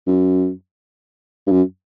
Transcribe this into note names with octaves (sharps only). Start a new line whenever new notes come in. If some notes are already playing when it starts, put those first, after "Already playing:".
F#2
G2
F#2